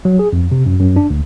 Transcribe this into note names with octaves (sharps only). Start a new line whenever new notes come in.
F#3
G#4
F2
C3
F#2
F#2
D4
D2